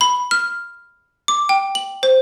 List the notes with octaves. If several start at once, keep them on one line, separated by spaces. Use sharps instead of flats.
B5
F6
D6
G5
F#7
C5